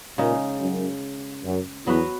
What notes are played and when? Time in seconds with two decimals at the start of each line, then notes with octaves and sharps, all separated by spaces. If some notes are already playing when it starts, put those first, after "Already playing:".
0.18 A#2 C#3 G#3 D#4
0.60 F#2
1.44 F#2
1.87 E2 F#3 B3 F#4 B4